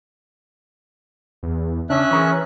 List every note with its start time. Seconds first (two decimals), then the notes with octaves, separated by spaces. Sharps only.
1.43 E2
1.90 C#3 C#4 D4 E5 F#6
2.11 E3 G#4 A#4 C#5